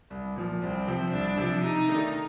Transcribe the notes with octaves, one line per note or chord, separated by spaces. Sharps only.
C2
A#2 F3
C2 C4
C3 F3
C2 D4
C3 F3
C3 D#4
D#3 A3 D4